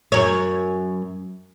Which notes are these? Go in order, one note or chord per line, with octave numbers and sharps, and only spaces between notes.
F#2 C#5